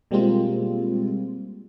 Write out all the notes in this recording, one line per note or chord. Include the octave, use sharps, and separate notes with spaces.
B2 G3 G#3 A#3 C4 F4